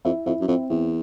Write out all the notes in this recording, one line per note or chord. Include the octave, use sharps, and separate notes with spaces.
F2 E4
F2 E4
F#2
F2 C4
E2 E4